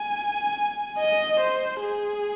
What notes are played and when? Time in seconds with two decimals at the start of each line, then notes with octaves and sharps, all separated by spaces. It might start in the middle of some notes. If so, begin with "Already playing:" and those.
Already playing: G#5
0.99 D#5
1.40 C5
1.81 G#4